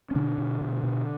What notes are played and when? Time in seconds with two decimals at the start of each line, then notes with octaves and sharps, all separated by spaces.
0.11 C#4
0.15 B2 D3 D4
0.38 B2
0.61 B2
0.83 B2